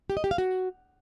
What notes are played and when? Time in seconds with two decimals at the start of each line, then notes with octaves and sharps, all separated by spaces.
0.10 G4
0.17 D#5
0.24 G4
0.31 F5
0.38 F#4